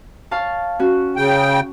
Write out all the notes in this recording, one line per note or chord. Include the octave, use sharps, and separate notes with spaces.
C#5 F5 A5
C#4 F#4
C#3 G5